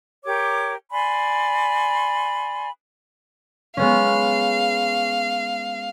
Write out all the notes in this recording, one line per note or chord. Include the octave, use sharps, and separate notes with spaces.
G4 A#4 C#5 D6
D5 G#5 B5 C6
G#3 B3 C#4 F5